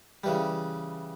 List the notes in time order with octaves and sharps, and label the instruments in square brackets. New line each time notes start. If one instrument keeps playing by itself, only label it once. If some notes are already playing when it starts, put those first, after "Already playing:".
[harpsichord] C#3 E3 G3